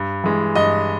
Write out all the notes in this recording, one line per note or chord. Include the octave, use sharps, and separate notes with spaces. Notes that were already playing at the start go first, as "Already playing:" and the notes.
Already playing: G2
E3 G#3
G2 D#5